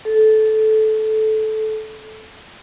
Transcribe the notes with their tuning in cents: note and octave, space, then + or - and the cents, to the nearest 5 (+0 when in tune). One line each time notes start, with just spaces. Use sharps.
A4 -15